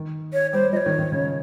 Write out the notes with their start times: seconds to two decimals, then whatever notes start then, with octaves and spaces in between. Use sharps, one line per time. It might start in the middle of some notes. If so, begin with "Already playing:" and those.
Already playing: D#3
0.33 C#5
0.53 G3 C5
0.72 F3 C#5 D#5
0.86 D#3
0.99 D#3
1.12 C#3